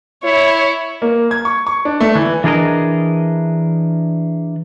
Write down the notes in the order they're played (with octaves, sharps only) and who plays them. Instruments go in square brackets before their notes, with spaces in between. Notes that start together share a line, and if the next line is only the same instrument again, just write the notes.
[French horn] E4 [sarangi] C#5
[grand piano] A#3
G#6
C#6
C#6
D4
A3
E3
[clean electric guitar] E3 D4 G#4 A#4 D#5